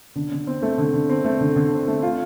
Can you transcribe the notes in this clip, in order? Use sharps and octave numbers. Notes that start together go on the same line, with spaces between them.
D3
D3
C4
A3
D3
D3
C4
A3
D3
D3
C4
A3
F4